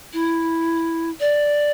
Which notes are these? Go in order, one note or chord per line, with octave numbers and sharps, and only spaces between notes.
E4
D5